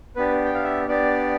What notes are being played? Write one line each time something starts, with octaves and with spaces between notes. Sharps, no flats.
B3 D4 G4 B4
G5
F5
E5
B3 D4 G4 D5